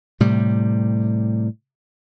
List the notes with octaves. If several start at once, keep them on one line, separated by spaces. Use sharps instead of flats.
A2 C3 G3